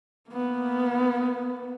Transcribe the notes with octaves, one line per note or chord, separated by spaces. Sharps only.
A#3 B3